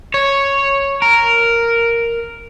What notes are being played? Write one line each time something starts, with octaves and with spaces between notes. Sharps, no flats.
C#5
A#4